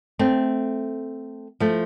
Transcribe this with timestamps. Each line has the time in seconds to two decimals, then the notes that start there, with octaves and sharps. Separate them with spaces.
0.19 A3 C4
1.60 F3 A3